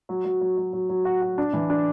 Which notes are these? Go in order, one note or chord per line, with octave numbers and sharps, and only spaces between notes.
F#3
F#3
F#3
F#3
F#3
F#3
F#4
F#4
D4
E3
D4